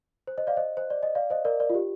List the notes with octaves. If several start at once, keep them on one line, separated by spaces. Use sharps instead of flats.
C5
C5 D#5
D5 F5
C5 D#5
C5
D5
D#5
D5 F5
C5 D#5
A#4 D5
A#4 D5
F4
G4